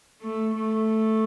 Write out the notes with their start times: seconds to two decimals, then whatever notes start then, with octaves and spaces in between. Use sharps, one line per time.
0.22 A3
0.56 A3